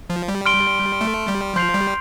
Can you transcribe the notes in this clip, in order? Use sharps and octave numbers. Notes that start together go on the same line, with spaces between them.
F3
G3
C6 F6 D7 G7
A3
G3
F3 C6 G6 C7 F7
G3